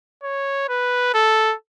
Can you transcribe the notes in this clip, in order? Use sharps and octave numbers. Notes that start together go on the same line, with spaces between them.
C#5
B4
A4